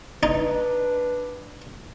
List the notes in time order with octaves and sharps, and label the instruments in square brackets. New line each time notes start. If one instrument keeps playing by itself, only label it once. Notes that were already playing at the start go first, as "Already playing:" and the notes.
[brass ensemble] D4 B4 [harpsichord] D#4